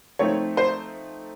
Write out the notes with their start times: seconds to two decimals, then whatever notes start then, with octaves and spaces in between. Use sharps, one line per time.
0.19 F3 A3 C4 D#4 C#5
0.57 C5